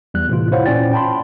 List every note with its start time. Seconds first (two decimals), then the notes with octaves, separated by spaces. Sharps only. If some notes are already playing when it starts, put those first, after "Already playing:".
0.14 E2 G3 F#6
0.29 A2 C3 E3 F4
0.52 E4 C5 C#5 F5 F#5
0.66 A#2 C#4 F4 D5 G5 A6
0.93 G5 A5 B5 C6